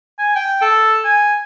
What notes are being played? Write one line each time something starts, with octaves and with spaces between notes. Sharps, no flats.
G#5
G5
A4
G#5